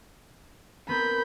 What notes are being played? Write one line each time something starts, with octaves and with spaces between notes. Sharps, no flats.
B3 C4 A#4 B5 G6